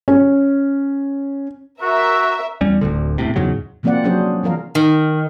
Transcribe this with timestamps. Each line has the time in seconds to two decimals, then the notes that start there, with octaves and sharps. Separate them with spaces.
0.08 C#4
1.82 F#4 A#4 E5
2.61 E2 G3 C#4
2.81 D1 D2 D3
3.18 E1 A2 C3
3.36 E2 G#2 C#3 F#3
3.83 C3 F3 A#3 C4 D5 F#5
4.04 F#3 C#4 D4 G#4 C5
4.43 E3 F3 A#4 F5
4.75 D#3